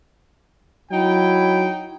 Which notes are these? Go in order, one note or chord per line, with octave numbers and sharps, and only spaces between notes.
F#3 D#4 E4 G5